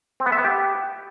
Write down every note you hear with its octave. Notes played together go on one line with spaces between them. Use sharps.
C4
B3
E5
B3
G4